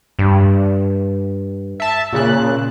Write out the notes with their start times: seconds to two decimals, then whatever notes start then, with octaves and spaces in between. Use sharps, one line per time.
0.19 G2
1.80 E5 A5
2.13 A#2 C#3 F#6